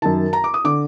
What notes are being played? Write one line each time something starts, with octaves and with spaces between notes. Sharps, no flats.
F#2 D#3 A5
A#5
D6
D#6
D3 D6